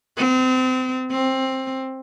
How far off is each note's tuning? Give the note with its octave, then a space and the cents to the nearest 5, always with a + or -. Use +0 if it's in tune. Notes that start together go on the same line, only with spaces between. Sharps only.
C4 -30
C4 +15